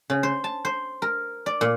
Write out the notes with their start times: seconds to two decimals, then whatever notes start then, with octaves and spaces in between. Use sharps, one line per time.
0.10 C#3
0.23 C5
0.44 A5
0.65 C5
1.02 A#4
1.46 D5
1.61 A#2